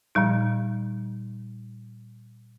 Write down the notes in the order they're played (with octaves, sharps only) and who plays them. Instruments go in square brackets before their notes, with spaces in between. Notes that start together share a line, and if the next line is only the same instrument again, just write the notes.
[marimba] A#2 F3 G3 D#4